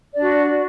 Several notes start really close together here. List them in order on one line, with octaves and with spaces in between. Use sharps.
D5 D4 F#4